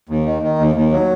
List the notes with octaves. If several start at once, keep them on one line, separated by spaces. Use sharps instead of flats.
D#2
D#3
D#3
D#2
D#2
F#3